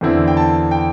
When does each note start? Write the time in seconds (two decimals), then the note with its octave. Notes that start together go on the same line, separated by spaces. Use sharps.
0.01 E2 D3 C4 E4
0.28 G5
0.37 A5
0.71 G5